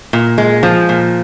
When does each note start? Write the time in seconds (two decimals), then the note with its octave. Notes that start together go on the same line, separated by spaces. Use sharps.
0.13 A#2
0.38 G#3
0.63 F3
0.89 A#2